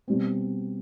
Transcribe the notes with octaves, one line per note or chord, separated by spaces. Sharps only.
B2 G3 C4